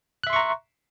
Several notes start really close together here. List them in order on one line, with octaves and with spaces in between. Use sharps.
F#6 E5 C6 C#6 A#5